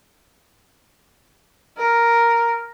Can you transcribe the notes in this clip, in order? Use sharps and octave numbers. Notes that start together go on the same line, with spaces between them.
A#4